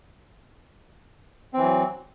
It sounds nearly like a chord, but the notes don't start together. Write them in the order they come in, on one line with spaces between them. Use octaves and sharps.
C4 E3 F#3